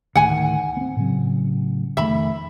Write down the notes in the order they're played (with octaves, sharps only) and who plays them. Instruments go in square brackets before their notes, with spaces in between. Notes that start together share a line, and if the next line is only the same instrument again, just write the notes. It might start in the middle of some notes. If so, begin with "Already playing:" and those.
[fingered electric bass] D2 A2 D#3 [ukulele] F#5 G#5
[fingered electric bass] B3 C4
A2 C#3 F#3
[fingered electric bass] F1 D#3 A3 [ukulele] E5 B5